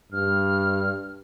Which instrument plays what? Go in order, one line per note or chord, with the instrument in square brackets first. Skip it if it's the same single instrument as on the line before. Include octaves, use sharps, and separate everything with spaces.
[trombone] G2 [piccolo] F6